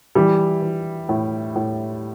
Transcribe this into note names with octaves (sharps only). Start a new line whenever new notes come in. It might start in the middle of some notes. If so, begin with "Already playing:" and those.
E3 G3
E3
A2
A2